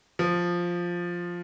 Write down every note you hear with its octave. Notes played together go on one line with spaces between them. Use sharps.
F3